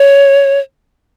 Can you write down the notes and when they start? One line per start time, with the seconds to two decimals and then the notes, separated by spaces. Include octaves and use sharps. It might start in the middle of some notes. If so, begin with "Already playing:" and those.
Already playing: C#5